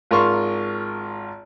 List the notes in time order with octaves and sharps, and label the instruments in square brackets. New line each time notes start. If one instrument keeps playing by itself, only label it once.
[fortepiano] G#1 F4 G#4 A#4 C6 C#6